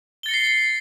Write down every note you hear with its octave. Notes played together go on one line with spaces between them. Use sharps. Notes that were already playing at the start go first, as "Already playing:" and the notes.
A6 A#6 C7 C#7 G7